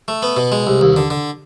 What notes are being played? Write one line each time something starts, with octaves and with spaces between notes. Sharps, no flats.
A3
B3
B2
G#3
C2
D#2
D3
D3